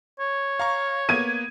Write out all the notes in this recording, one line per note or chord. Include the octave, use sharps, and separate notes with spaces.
C#5
F5 A#5 C#6
A#3 B3 G#6 D#7